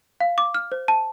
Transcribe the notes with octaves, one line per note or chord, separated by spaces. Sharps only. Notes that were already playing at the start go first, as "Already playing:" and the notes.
F5
D6
F6
C5
A5